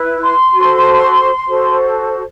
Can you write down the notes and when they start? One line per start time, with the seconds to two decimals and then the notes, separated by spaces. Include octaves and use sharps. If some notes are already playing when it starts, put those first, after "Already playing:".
Already playing: E4 B4
0.23 C6
0.54 F#4 A4 C5
1.48 F#4 A4 C5